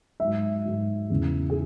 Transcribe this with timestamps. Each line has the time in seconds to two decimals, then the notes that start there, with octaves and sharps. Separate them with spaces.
0.20 G#2 F#3 E5
0.65 G#2 F#3
1.10 E2 C#3 E3
1.50 G#4